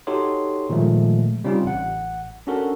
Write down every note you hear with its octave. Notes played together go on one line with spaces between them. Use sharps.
D#4 F#4 G4 A4 C#5 C6
A#2 D#3 F3 G#3 A3
C#3 G3 C4 C#4 D#4 F4
A1 F#5
C#4 D4 F#4 A4 A#4